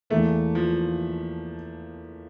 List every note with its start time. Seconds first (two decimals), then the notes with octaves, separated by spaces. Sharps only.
0.10 E2 E3 A3 A#3 D4
0.55 F3